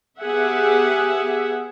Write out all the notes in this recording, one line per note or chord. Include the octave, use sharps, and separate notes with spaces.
B3 G4 G#4 E5 F#5